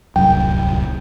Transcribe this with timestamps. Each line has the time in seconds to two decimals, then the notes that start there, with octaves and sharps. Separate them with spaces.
0.16 D1 C2 F#2 G5